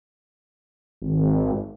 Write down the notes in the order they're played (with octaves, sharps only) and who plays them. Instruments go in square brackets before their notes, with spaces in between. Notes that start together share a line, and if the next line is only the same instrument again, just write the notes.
[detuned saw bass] G#1